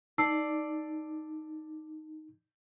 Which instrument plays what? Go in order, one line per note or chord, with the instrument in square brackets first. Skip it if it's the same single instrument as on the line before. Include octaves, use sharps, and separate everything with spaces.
[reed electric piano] D#4 [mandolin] D5 [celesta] A5 E6 C7